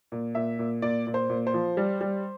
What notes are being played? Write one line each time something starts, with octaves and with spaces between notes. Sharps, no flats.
A#2
A#2 E5
A#2
A#2 D5
A#2
C5
A#2
C5
F3
G3
G3